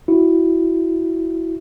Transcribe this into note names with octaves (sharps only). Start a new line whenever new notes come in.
E4 F#4